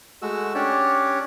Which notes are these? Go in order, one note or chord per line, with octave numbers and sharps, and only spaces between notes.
G#3 A3 F#4 E6
C#4 D4 G4 C#5 D5